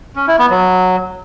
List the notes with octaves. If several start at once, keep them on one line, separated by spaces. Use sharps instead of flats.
C#4
E4
B3
F#3